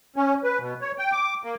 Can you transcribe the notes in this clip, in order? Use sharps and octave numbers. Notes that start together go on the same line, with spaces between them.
C#4
B4
B2
C#5
G5
D6
A#3